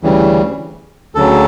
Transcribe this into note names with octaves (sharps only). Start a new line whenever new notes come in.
D2 C#3 E3 G3
D2 C#3 F#3 A4